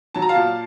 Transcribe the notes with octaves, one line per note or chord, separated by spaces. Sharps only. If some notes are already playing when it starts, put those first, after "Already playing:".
F#3 A5
A#5
F5 A5
A#2